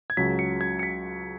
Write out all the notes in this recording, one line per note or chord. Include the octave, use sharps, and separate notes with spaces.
G#6
C#2 C#3 F#3 B6
C#7
G#6
C#7
B6